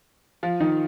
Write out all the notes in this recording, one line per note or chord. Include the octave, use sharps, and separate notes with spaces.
F3 F4
D#3 D#4